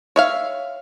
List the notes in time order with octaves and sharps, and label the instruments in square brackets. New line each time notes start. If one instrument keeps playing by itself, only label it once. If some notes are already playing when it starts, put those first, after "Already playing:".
[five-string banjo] C#5 E5 F5